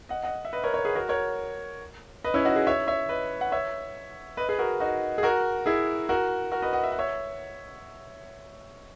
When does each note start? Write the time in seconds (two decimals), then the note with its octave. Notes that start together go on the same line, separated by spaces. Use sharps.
0.09 D#5 F#5
0.24 D#5 F#5
0.45 E5
0.53 B4 D#5
0.64 A#4 C#5
0.74 A#4 C#5
0.85 G#4 B4
0.95 F#4 A#4
1.09 A#4 C#5
2.24 B4 D#5
2.34 C#4 E4
2.45 D#4 F#4
2.56 E4 G#4
2.67 C#5 E5
2.87 C#5 E5
3.09 B4 D#5
3.41 F#5
3.52 C#5 E5
4.37 B4 D#5
4.49 G#4 B4
4.59 F#4 A#4
4.80 D#4 F#4
5.18 G#4
5.23 F#4 A#4
5.66 E4 G#4
6.09 F#4 A#4
6.52 F#4 A#4
6.62 B4 D#5
6.73 D#5 F#5
6.84 E5
6.92 F#5
6.99 C#5 E5